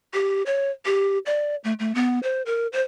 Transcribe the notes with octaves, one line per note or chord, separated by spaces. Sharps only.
G4
C#5
G4
D5
A3
A3
B3
C5
A#4
C5